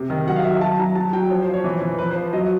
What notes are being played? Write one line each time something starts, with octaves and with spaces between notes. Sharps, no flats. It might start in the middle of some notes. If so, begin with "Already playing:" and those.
Already playing: C3
D#3
F#3 F#5
F5
F#3 E5
F#3 A5
F#3 A#5
F#3 A5
F#3 G5
F3 C#5
C5
F3
C#5
E3
E3
F3 B4
C5
F3
F#3 D#5